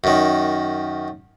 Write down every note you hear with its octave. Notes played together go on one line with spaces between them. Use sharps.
F#2 D#3